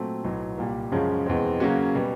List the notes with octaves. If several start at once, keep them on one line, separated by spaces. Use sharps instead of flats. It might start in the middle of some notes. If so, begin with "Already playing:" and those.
Already playing: A#2 F#3 A3 C4
B1 A2 F#3
C2 A#2 G3
F#2 C#3 F3 G#3 C#4
E2 B2 G#3 C4
C#3 F#3 A#3 C#4 F#4
B2 G3